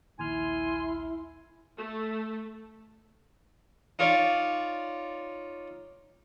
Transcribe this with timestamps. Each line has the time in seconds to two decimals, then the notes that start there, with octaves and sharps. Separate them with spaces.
0.19 A#1 D#2 E4 G#5 C6 F6
1.78 A3
3.99 D#4 F4 C#5 D5